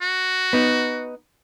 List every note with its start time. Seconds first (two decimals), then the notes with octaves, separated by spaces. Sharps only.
0.02 F#4
0.53 B3 D#4